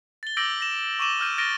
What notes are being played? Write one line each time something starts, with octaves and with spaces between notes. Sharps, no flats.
A6 G7
D6 E6 G6 A#6 D7 F#7
A#6 E7
C#6 D6 D#7 E7 F#7 G7
E6 F6 G6 D#7
F6 A6 A#6 D7 D#7 G7